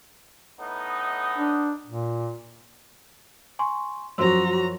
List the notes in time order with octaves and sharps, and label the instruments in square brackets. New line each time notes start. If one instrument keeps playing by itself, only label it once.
[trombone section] A2 B3 D#4
[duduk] D4
A#2
[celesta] G#5 C6 C#6
[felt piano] F#2 F3 [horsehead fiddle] F#4 A#5 [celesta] C5 C6 E6